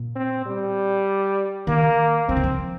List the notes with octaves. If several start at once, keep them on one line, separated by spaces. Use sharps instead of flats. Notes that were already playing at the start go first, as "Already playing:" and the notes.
Already playing: A#2
C4
G3
D#3 A#3
F3 C4
D#3
F3